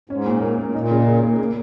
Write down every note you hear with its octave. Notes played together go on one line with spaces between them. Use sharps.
G#2 C#4
A#2
A#4
A#3
A#2 D#4
C#3
G#4
A#3
A#3